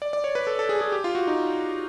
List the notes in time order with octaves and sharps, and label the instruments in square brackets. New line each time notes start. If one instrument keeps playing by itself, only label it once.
[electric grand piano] D5
D5
C#5
B4
A4
A4
G#4
G#4
G4
F4
F#4
D#4